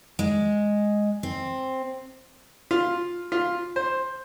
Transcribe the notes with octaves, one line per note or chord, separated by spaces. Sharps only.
G#3
C4
F4
F4
C5